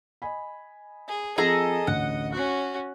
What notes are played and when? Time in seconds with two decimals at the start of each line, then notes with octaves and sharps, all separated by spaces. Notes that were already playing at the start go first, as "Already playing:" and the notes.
0.22 D#5 G#5 B5
1.08 G#4
1.38 F3 C4 G#4 A4 D#5 A#5
1.87 A1 D2 F#5
2.32 C#4 F#4 F#6